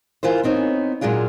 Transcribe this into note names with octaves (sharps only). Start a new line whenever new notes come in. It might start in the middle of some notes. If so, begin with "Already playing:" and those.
E3 F4 A#4 C5
B3 C4 D#4 C#5
A#2 F#3 G#3 D4 F4